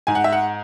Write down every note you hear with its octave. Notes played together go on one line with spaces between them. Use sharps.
G#2 G#5
F#5
E5
F#5